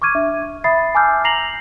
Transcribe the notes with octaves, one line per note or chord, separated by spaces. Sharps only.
C#6 D6 F6 G#6 D#7
D4 E5
E5 B5 D#6 A6 C7
G#5 A5 D6 E6 F6 G6
A#5 A#6 C7 F7 F#7